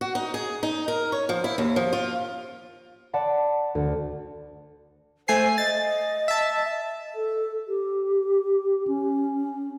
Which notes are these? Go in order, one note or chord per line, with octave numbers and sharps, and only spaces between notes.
F#4
D#4
G#4
D#4
A#4
C#5
F3
E4
D#2
F3
F4
D5 F#5 A5 B5
D2
A3 C5 G#5 C7
D#5 A6
E5 A5
A4
G4
C#4